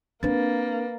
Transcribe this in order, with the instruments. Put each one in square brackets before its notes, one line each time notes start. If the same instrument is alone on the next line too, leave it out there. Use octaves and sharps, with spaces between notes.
[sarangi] A#3 [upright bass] C4 D4 [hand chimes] B4 A6